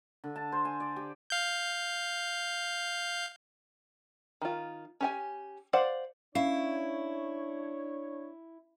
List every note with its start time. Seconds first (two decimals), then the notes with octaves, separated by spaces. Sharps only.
0.24 D3
0.36 A5
0.52 C5
0.65 G#5
0.80 D5
0.96 G4
1.30 F5 G6
4.42 D#3 F4
5.01 C#4 G4 G#5
5.73 C5 D5 F5 F#5
6.35 C#4 D4 E4 C#5 F5